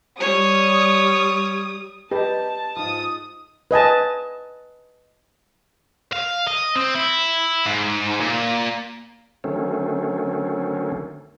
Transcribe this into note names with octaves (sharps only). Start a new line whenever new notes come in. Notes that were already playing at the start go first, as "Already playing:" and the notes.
G3 C#5 D#6
D#4 G4 B4 A5
G#2 F4 D#6
B4 D#5 G#5 A5
F5
D#5
C4
E4
G#2
A#2
D3 D#3 F#3 A3 C4 C#4